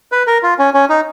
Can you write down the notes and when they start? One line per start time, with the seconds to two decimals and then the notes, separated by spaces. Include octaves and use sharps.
0.12 B4
0.27 A#4
0.43 F4
0.59 C#4
0.74 C#4
0.89 D#4